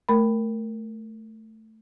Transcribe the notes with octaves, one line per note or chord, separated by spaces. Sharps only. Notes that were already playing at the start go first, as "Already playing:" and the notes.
A3 A#4 B5